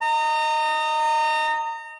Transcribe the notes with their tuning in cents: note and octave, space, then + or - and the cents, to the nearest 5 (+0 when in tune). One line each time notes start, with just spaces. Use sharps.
D#5 +0 A#5 -30